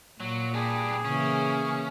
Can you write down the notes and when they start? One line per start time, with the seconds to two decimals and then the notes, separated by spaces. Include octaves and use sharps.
0.20 A#2 F#3
0.54 G3 D4 G#4
1.05 C#3 E3 A#3 C#4